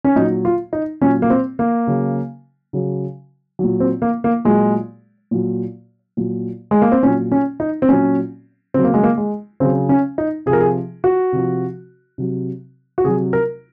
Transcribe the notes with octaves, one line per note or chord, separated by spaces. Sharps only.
C#4
A#2 F#3 D#4
F4
D#4
A#2 F#3 C#4
A#3
C4
A#3
C#3 F#3
C#3 F#3
A#2 F#3
C4
A#3
A#3
A#2 F#3 G#3
A#2 F#3
A#2 F#3
G#3
A#3
C4
A#2 F#3 C#4
C#4
D#4
C4
A#2 F#3 C#4
C#3 F#3 C4
A#3
G#3
A#3
G#3
C#3 F#3 C4
C#4
D#4
C3 F3 G#4 A#4
G#4
F#4
C3 F3
C3 F#3
F#4
C3 F#3 G#4
A#4